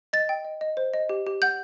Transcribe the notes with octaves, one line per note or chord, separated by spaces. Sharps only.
D#5 A6
G5
D#5
D#5
C5
D#5
G4
G4
F#5 G6